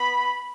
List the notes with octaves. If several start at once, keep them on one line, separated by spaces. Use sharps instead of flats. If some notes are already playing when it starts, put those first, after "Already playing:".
Already playing: B3 B5